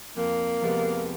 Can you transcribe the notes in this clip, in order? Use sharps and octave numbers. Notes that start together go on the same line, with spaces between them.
F2 A#3
C3 F3 G#3 B3